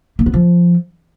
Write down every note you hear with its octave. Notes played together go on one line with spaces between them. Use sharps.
A#3
B3
F3